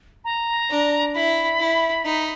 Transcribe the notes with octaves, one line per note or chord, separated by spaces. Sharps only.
A#5
D4
E4 B5
E4
D#4